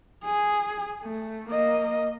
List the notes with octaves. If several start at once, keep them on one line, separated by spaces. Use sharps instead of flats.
G#4
A3
A#3 D#5